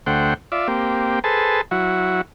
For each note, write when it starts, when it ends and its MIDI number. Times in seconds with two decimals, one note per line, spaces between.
0.06 0.34 38
0.06 0.34 57
0.06 0.34 72
0.06 0.34 78
0.06 0.34 79
0.52 0.68 65
0.52 0.68 74
0.52 0.68 76
0.68 1.19 58
0.68 1.19 60
0.68 1.19 67
1.24 1.61 68
1.24 1.61 69
1.24 1.61 71
1.24 1.61 72
1.24 1.61 81
1.71 2.21 54
1.71 2.21 64
1.71 2.21 66